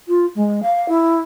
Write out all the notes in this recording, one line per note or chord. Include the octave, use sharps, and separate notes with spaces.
F4
G#3
F5
E4